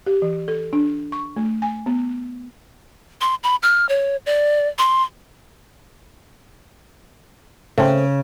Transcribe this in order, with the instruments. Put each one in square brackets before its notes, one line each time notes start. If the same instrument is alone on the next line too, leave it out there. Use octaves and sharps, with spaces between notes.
[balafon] G4
E3
A4
D4
C#6
A3
G#5
B3
[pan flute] C6
B5
F6
C#5
D5
C6
[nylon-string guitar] C#3 [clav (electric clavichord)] A3 C4